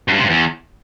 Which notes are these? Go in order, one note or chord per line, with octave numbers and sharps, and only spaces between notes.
F#2
G2
C3
G2
E2